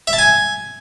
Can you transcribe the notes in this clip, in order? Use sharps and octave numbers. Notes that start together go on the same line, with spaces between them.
E5
A5
G#5